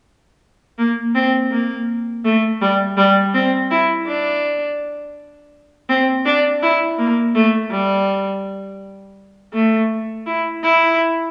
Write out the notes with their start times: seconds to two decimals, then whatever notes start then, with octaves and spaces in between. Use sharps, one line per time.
0.78 A#3
1.15 C4
1.51 A#3
2.25 A3
2.61 G3
2.97 G3
3.34 C4
3.71 E4
4.07 D4
5.89 C4
6.25 D4
6.62 E4
6.98 A#3
7.35 A3
7.71 G3
9.53 A3
10.26 E4
10.64 E4